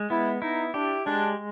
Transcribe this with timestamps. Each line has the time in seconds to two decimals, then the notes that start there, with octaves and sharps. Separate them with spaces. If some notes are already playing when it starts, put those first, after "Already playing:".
Already playing: G#3
0.10 B3 E4
0.42 D#4 E4
0.74 D4 G4
1.06 G#3 D4